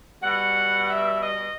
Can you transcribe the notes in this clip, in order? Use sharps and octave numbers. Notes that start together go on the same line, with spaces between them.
B2 G3 F#5
E5
D#5